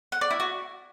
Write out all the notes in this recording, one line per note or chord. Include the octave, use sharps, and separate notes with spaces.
F#5
D5
E4
F#4